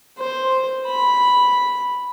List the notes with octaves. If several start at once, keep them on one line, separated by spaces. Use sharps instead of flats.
C5
B5